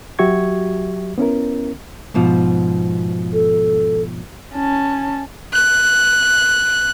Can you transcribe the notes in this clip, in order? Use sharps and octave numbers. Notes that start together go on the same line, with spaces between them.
F#3 F#4 G4 E5 C#6 G#6
B3 C#4 E4 A#4
G#2 B2 F3
A4
C#4 A5
F#6